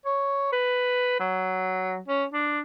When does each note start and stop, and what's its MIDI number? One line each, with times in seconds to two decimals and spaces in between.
0.05 0.48 73
0.52 1.19 71
1.20 1.98 54
2.08 2.25 61
2.33 2.60 62